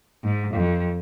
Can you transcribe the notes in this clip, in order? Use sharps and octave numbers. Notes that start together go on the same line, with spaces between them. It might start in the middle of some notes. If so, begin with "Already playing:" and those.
G#2
F2